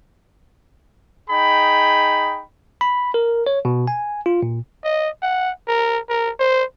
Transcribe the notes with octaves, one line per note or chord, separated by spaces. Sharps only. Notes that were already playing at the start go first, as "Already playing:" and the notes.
D#4 G#4 G5 B5
B5
A#4
C#5
B2
G#5
F4
A#2
D#5
F#5
A#4
A#4
C5